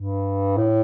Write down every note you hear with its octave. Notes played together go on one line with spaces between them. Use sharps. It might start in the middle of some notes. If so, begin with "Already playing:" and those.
Already playing: G2
A2